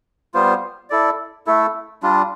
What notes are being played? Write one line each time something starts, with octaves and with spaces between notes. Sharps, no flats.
G3 B3 F4 C5
E4 A4 D5
A3 E4 A4
G3 D4 F4